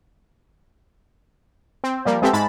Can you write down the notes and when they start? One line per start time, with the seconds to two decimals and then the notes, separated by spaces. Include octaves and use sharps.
1.84 C4
2.05 F3 G3 A#3
2.22 G#3 B3 C4 G4 A4 E5
2.33 G#2 G#3 A5 B5 A6